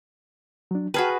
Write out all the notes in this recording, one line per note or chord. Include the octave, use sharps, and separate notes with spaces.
F#3 D4
F#4 G#4 B4 G5 A5 F6